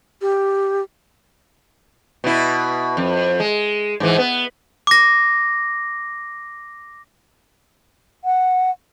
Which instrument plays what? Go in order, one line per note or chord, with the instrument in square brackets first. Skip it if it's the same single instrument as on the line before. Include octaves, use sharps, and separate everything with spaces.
[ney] G4
[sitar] B2 E4
F2
G#3
G#2 E3
B3
[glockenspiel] D6 A#6
[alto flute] F#5